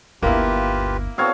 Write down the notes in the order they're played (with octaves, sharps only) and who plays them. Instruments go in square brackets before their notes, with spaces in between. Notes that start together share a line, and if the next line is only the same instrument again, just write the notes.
[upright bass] G1 D2 [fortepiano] A#3 E4 [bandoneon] F4 G4 B4
[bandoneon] B3 C4 F#4 [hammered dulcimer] A4 C#5 F5